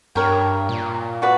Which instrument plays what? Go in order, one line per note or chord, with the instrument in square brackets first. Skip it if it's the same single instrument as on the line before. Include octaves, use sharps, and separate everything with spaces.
[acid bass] G2 [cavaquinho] A#4 C#5 G5
[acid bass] A#2
[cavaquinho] F#4 B4 D5